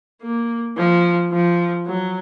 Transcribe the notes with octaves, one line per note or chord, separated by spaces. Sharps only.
A#3
F3
F3
F#3